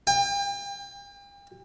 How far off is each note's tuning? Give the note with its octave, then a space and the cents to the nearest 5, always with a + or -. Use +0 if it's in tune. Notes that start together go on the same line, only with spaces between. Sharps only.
G5 +40